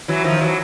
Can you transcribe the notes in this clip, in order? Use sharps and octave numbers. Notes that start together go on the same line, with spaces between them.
E3 F#3
D#3 F3
E3 F#3